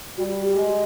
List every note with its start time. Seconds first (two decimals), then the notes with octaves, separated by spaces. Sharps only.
0.18 G3 F#4
0.42 G4
0.55 G#3